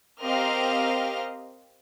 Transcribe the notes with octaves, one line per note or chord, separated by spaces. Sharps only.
C4 G4 A#4 D#5 F5 F6